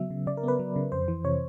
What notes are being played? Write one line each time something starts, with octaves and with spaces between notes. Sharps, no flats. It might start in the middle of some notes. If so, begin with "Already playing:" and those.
Already playing: C#3 F#3 B3 E5
C#3
C#3 D5
A#4
B3 B4
F#3
C#3
F2 C5
E3
C3 C#5